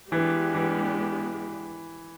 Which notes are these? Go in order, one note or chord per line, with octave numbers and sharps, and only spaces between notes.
E3 G#3 B3 D4 G4
E3